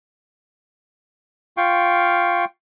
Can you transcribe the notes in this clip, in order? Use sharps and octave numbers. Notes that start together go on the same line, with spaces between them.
F4 F5 G5 C#6